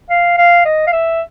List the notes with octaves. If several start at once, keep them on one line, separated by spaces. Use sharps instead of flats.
F5
F5
D#5
F5
E5